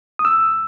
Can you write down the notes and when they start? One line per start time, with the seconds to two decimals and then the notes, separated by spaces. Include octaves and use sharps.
0.19 D#6
0.25 E6